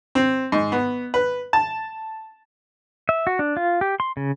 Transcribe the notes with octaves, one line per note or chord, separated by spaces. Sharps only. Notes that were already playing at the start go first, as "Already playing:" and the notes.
C4
G#2
B3
B4
A5
E5
F#4
D4
F4
G4
C6
C#3